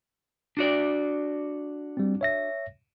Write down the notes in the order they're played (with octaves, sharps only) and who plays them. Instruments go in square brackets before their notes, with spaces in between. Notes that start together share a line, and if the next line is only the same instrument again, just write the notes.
[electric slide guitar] D4 F#4 D5
[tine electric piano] G3 C4
C#5 E5 A#6